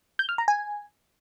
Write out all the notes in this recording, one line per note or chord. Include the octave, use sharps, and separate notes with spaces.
G6
F6
A#5
G#5